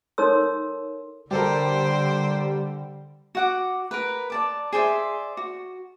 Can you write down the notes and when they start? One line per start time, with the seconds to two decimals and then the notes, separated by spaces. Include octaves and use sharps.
0.18 D#4 A4 A#4 C#5 C6 E6
1.31 D3 G3 G4 A4 A#4 C5 G5
3.35 F#4 F#5 D6
3.91 A#4 B4
4.30 D5 A5 D6
4.73 G#4 C5 D5 E5
5.37 F#4